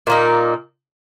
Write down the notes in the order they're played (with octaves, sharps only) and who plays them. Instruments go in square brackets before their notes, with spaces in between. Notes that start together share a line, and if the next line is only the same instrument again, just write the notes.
[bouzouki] A#2 A#3 D#4